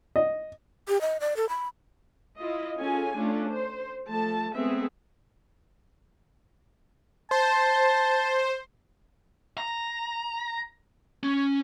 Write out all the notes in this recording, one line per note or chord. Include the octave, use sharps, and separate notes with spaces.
D#5
G4
D#5
D5
A4
B5
E4 F4 D#5
C#4 F4 G#4 A4 G#5
A3 C#4 D4 F4
C5
F3 A3 A4 A5
G#3 A3 B3 C4 G#4 E5
C5 A5
A#5
C#4